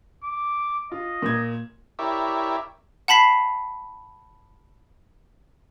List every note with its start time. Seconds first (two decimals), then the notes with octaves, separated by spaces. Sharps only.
0.24 D6
0.92 F4 D#5
1.22 A#2 G#6
1.99 E4 G4 A#4 C#5 D5 E5
3.08 F#5 A5 B5 B6 C7